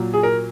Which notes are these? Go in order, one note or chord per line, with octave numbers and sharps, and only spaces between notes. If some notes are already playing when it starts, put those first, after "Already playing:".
Already playing: A#2 F#3
G#4
A#4